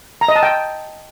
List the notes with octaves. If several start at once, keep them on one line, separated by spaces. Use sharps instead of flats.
A#5
D#5
A5
G5